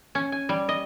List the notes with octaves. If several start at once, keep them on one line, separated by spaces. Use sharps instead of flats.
C#4
G#5
G3
D#5